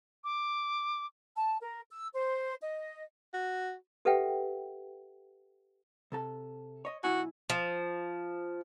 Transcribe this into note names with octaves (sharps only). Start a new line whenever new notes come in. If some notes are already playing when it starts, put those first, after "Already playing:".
D6
A5
A#4
E6
C5
D#5
F#4
G4 A4 B4 E5 F#5 G5
C3 A4 A5
C#5 D#5
B1 E4 F#4 G#5
F3